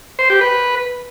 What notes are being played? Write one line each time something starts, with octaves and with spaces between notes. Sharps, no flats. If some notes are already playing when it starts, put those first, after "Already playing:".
C5
G4
B4